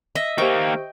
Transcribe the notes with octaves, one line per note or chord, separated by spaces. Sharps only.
D#5 E5
D#3 A#3 G4 C5 G5 C#6